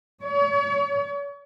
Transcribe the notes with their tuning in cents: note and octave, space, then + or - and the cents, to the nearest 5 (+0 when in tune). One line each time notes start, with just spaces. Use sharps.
C#5 +40